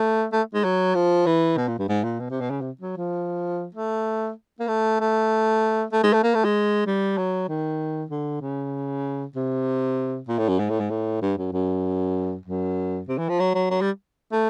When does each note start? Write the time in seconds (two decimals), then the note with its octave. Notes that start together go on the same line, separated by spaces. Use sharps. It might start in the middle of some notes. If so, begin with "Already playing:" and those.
Already playing: A3
0.32 A3
0.54 G#3
0.64 F#3
0.95 F3
1.26 E3
1.57 B2
1.68 A#2
1.78 G2
1.88 G#2
2.04 A#2
2.20 B2
2.30 C3
2.41 B2
2.50 C#3
2.61 C3
2.81 F#3
2.97 F3
3.75 A3
4.60 A#3
4.68 A3
5.00 A3
5.92 A3
6.03 G#3
6.13 A3
6.23 A#3
6.34 A3
6.44 G#3
6.86 G3
7.17 F#3
7.48 D#3
8.10 D3
8.41 C#3
9.35 C3
10.28 A#2
10.38 A2
10.49 F#2
10.59 G#2
10.70 A2
10.80 G#2
10.90 A2
11.22 G2
11.38 F#2
11.53 F#2
12.45 F#2
13.08 C3
13.18 E3
13.29 F3
13.39 F#3
13.54 F#3
13.70 F#3
13.81 G3
14.32 A3